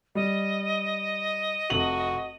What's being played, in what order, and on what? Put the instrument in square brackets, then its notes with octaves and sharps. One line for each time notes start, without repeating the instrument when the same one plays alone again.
[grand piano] G3 [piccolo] D#5
[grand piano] F1 F#7 [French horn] F#4